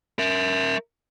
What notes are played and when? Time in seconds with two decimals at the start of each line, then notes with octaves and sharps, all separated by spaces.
0.19 A#4 E5